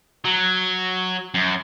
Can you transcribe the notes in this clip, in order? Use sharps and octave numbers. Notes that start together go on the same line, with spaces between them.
F#3
F#2